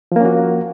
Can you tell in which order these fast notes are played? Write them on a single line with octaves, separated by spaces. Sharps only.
F3 A#3 C#4 F#4